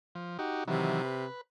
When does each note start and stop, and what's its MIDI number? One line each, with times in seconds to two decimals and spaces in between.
0.15 0.38 53
0.39 0.64 63
0.39 0.64 66
0.39 0.64 67
0.68 1.25 48
0.68 1.02 51
0.68 1.02 52
0.68 1.02 54
1.05 1.41 71